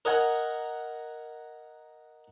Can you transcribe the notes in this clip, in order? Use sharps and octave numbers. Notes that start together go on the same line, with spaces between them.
A#4 D#5 F#5 G#5 A#5